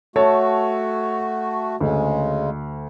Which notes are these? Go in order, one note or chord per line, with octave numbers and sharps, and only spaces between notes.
A3 F#4 A4 C#5 A5
D2 C#3 G#3